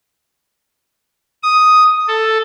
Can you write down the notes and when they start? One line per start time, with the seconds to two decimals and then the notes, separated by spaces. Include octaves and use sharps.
1.43 D#6
2.08 A4